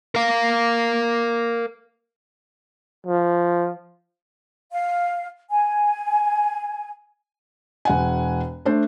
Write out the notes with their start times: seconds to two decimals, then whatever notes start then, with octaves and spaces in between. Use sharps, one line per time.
0.15 A#4 F5
3.07 F3
4.72 F5
5.50 G#5
7.85 E1 F#5 G#5
8.66 A3 D4 C5